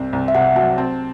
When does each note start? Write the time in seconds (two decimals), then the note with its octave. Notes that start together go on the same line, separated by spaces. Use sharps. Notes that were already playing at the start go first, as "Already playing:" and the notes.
Already playing: C2 C4
0.13 C2
0.28 E5
0.35 C3 F#5
0.56 F#3 A5
0.78 C4 A5